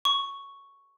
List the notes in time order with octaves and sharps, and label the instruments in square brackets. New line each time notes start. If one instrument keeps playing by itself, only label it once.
[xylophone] C#6